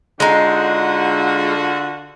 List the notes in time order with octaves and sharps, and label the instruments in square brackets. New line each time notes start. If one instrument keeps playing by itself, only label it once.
[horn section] D3 F4 F#4 [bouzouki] G#3 D#4